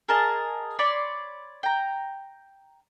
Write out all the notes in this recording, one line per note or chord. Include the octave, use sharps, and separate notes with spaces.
G#4 A#4 D#5 A5
C#5 D5 B5 C6
G5 A#5